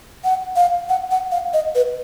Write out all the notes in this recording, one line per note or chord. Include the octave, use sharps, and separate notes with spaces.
F#5
F5
F#5
F#5
F5
D#5
B4